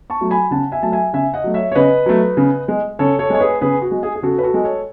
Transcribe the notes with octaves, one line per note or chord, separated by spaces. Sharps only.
A5 C#6
F#3 A3
G#5 B5
C#3 F#5 A5
E5 G#5
F#3 A3 A5
E5 G#5
C#3 E5 G#5
D#5 F#5
F#3 A3
C#5 E5
C#5
C#3 B4 D#5
F#3 A3
C#3
G#3
C#3 A4 C#5
A4 C#5
G#3 C#5
G#4 B4
C#3 G#4 B4
F#4
G#3
G#4
G#4
C#3 F#4 A4
B4
F#4 A4
G#3
A4 C#5